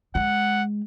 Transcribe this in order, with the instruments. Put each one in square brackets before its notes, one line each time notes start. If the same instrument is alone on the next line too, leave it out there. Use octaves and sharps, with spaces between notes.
[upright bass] G#3 [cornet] F#5